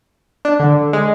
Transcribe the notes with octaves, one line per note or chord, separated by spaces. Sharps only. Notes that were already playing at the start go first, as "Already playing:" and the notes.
D4
D3
G#3